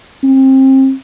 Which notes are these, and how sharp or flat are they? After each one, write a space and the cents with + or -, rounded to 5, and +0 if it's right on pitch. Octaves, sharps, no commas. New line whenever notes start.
C4 +30